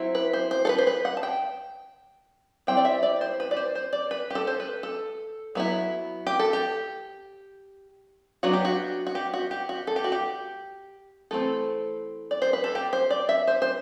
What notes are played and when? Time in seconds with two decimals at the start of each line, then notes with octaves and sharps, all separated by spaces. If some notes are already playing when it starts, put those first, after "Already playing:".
Already playing: F#3 C4 E4
0.15 B4
0.33 C5
0.51 C5
0.65 A4
0.69 B4
0.78 C5
0.87 B4
1.05 F#5
1.17 A5
1.23 G5
2.67 G3 C4 E4 G5
2.77 D5
2.85 E5
3.03 D5
3.21 C5
3.40 B4
3.51 D5
3.57 C5
3.75 C5
3.93 D5
4.11 B4
4.30 G4
4.35 A4
4.47 C5
4.60 B4
4.83 A4
5.55 F#3 B3 E4
6.27 G4
6.39 A4
6.53 G4
8.43 F#3 B3 D4 F#4
8.53 G4
8.65 F#4
9.07 F#4
9.15 G4
9.34 F#4
9.51 G4
9.69 F#4
9.87 A4
9.96 G4
10.04 F#4
10.12 G4
11.31 E3 A3 C4 A4
12.31 D5
12.42 C5
12.53 B4
12.64 A4
12.75 G4
12.93 C5
13.10 D5
13.29 E5
13.47 C5
13.62 C5